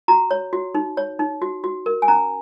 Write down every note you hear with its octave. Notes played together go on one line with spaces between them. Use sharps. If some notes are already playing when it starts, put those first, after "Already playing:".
F#4 A#5
C#5
F#4
D#4
C#5
D#4
F#4
F#4
A#4
G#5
C#4 A#5